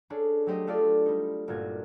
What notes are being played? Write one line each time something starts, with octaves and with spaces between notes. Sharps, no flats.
C#4 D4 G#4 A4
F#3 A3 G4 C5 D#5
A3 C4 D4 F4 A4 D5
G3 D#4
G1 A#2 F4 F#4 G#6